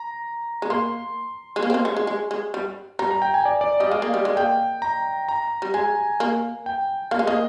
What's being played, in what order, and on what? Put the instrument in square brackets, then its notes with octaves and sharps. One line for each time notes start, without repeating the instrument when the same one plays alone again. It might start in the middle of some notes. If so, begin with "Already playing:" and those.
Already playing: [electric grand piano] A#5
[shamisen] G#3
[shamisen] A#3 [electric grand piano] C6
[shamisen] G#3
A#3
C4
A#3
G#3
G#3
G#3
G#3
G3
[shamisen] G3 [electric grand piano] A#5
[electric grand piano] A#5
G5
G#5
D5
D5
[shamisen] G3 [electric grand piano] D#5
[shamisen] G#3 [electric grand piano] F5
[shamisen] A#3
G3
G#3
[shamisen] A#3 [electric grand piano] G5
[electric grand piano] A#5
A#5
[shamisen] G3
[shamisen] G#3 [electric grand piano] G#5
[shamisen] A#3
[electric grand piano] G5
[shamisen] A#3 [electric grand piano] F5
[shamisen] G#3
[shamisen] A#3 [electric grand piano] D#5